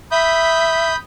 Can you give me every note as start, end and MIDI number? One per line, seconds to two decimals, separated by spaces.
0.11 0.93 76
0.11 0.96 83
0.11 0.96 87
0.11 0.96 91